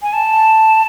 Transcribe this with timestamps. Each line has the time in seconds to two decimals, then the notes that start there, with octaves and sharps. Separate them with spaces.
0.02 G#5
0.13 A5